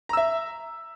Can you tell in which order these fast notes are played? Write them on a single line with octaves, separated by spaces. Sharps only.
A#5 E6 E5